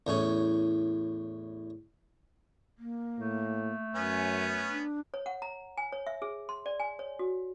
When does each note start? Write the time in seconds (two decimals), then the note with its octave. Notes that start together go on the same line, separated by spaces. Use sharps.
0.07 E2 A2 C#4
2.78 A#3
3.19 A2 A3
3.95 F#2 B3 C#4 G#5
4.69 D4
5.14 C#5
5.26 F#5
5.42 A#5
5.78 G#5
5.92 C#5
6.07 E5
6.22 G#4
6.49 C6
6.66 D5
6.80 G#5
6.99 C#5
7.19 F#4